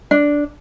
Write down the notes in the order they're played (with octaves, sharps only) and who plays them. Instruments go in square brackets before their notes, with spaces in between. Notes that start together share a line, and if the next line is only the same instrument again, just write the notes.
[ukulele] D4